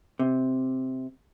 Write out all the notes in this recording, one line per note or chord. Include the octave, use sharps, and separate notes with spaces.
C3